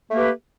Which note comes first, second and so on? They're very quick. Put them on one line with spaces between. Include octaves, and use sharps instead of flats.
A3 A#3 G4 B4